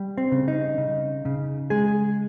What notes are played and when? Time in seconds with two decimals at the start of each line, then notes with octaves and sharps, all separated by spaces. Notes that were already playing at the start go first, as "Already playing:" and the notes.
Already playing: G3
0.18 C4
0.32 C#3
0.48 D#4
0.78 C#3
1.25 C#3
1.70 G#3 G#4